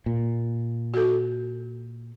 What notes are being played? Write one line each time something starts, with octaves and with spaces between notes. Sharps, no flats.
A#2
F#4 A4